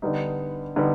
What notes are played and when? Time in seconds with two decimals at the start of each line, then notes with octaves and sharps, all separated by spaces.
0.02 D3 G3 B3 D#4
0.76 D3 G3 B3 D#4